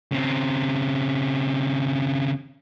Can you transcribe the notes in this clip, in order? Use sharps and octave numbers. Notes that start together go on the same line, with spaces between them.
C#3 C4